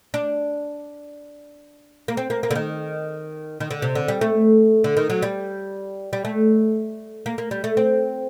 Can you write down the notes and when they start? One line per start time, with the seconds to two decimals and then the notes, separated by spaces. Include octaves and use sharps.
0.14 D4
2.08 A#3
2.17 C4
2.30 A#3
2.43 A#3
2.51 D3
2.55 D#3
3.60 D#3
3.71 D3
3.82 C3
3.95 D3
4.08 G3
4.21 A3
4.84 D3
4.97 D#3
5.10 F#3
5.22 G3
6.13 G3
6.25 A3
7.26 A#3
7.38 A#3
7.51 G3
7.64 A3
7.77 C4